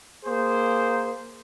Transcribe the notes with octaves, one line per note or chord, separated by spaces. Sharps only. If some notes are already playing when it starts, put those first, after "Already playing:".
A#3 G#4 C5